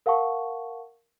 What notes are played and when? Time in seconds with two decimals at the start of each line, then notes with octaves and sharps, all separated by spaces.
0.06 A#4 F5 F#5 A5 C#6